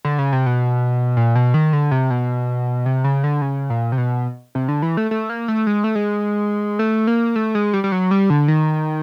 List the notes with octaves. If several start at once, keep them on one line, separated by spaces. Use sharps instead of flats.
D3
C#3
C3
B2
A#2
B2
D#3
D3
C3
B2
C3
C#3
D3
C#3
A#2
C3
B2
C3
D3
E3
A3
A3
A#3
A3
G#3
A3
G#3
A3
A#3
A3
G#3
G3
G3
F#3
G3
D3
D#3